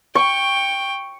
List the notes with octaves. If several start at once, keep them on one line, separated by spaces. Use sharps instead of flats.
G5 C#6